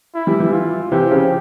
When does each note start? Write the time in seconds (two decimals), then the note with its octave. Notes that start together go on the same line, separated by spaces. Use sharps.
0.15 E4
0.27 E3 G3
0.40 E3 G3
0.53 F4
0.91 C3 E3 G4
1.11 C#3 F3